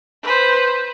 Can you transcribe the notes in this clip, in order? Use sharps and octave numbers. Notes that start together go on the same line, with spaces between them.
B4 C5